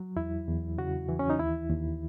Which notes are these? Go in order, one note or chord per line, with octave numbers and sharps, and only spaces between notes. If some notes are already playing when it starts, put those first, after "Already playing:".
Already playing: F#3
E2 E4
E2
C#3 F#4
E3
C#4
D#4
D#2 E4
D#2